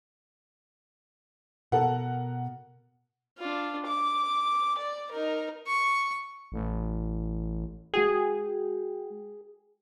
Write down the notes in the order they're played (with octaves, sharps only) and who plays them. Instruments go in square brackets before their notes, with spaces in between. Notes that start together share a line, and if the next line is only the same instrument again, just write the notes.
[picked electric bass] B2 [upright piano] A4 A#4 F#5
[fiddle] D4 F4
D6
D5
D#4 A#4
[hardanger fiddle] C#6
[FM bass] A1
[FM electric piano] G#3 F#4 G5 [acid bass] G#4